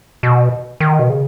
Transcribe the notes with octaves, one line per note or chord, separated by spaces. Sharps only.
B2
D#3
B2
C#3